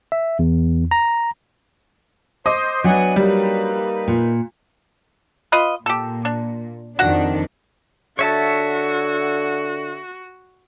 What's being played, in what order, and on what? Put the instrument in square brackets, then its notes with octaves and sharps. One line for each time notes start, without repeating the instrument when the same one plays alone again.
[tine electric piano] E5
E2
A#5
[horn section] C5 [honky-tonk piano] D#5 D6 D#6
[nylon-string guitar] F#3 D4 [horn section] B3 F#5 G#5
[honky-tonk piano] G3 [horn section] A#3 D#4 B4
[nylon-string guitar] A#2
[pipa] F4 B4 D#5
[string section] A#2 [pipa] G4 A4
[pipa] D4
[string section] F2 D#3 D4 [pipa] F#4 F#5
[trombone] D3 [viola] F#4 [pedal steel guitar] C#5 E5 A5